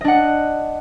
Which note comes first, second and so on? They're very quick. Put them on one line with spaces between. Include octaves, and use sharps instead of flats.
D#5 D4 F#5